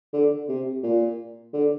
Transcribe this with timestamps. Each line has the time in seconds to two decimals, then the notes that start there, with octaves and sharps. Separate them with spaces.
0.13 D3
0.49 C3
0.83 A#2
1.54 D3